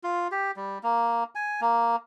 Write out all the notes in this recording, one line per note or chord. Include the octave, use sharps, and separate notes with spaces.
F4
G4
G3
A#3
G#5
A#3